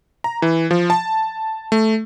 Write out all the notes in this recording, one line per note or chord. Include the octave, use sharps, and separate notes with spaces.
A#5
E3
F3
A5
A3